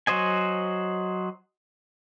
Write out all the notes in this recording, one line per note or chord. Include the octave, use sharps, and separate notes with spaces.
F#3 F#4 C5 D#5 G#5